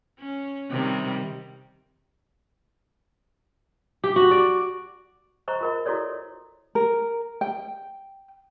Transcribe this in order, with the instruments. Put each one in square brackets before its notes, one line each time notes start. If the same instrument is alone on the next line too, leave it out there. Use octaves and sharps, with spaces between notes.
[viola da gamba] C#4
C3 D#3 G3
[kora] G4
F#4
D5
[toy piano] C5 D#5 A#5 C#6
F4 A#4 D#5
E4 F#4 A4 C#5 D5
[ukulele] A#4
G5